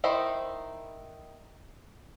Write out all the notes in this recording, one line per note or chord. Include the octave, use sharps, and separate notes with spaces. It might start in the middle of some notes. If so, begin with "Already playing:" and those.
D#3 D#4 E4 C5 B5